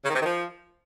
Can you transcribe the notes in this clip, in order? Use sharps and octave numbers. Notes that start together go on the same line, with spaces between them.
C#3
D#3
C3
D#3
F3